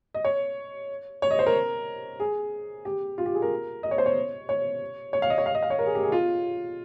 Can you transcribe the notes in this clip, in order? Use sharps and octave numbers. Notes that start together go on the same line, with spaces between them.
D#5
C#5
C#5
D#5
C5
A#4
G#4
G4
F4
G4
G#4
A#4
D#5
C#5
C5
C#5
C#5
C#5
F5
D#5
C#5
F5
D#5
F5
C#5
A#4
G#4
G4
G#4
F4